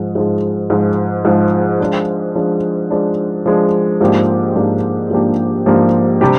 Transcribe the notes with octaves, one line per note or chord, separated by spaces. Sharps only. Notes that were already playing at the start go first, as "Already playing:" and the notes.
Already playing: G#2 F3 G#3
G#2 F3 G#3
G#2 F3 G#3
G#2 F3 G#3
F3 G#3 D4
F3 G#3 D4
F3 G#3 D4
F3 G#3 D4
G#2 F3 A#3 D4 G4
G#2 F3 A#3 D4 G4
G#2 F3 A#3 D4 G4
G#2 F3 A#3 D4 G4
C3 G3 D4 G4